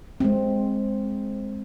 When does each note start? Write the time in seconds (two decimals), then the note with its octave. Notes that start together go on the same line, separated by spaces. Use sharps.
0.20 G#3 C4